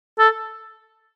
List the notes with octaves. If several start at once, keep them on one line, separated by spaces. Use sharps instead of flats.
A4